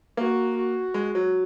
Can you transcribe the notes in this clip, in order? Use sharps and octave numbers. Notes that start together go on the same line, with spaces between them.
A#3 F#4
F#4
G#3
F#3